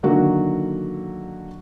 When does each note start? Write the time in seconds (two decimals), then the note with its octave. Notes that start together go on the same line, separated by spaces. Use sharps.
0.03 D3 D#3 F#3 A#3 F#4 A#4